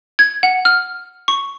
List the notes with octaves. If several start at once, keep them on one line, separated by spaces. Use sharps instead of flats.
G#6
F#5
F6
C#6